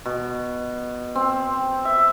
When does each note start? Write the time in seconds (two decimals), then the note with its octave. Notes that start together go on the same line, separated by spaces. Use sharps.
0.06 B2
1.15 C4
1.85 E5